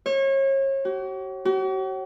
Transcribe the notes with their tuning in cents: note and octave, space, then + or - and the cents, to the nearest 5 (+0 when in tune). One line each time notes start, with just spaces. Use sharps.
C#5 -35
F#4 +45
F#4 +45